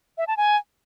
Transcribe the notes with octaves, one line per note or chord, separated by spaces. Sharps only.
E5
A5
G#5